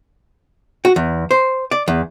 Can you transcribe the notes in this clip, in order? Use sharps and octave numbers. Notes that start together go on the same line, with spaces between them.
F#4
E2
C5
D5
E2